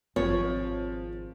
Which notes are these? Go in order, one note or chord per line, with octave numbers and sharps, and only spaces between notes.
G#1 F3 C4 C#5